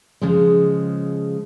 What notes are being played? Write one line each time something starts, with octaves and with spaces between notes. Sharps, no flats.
C#3 F3 G#3